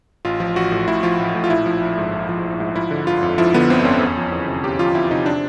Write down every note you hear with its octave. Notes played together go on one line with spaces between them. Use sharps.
A1 F4
F3
A1 F#4
A2
A1 E4
F3 F4
A1
A2
F4
A#1 E4
F3
A#1
G#2
A#1
F3
A#1
G#2
F3 E4
D3
G1 F4
F2
F3 E4
D3 B3
G1 C4
F2 C#4
E2
F3
E2
C3
E2 G4
F3 F4
E2 E4
C3 D#4
D4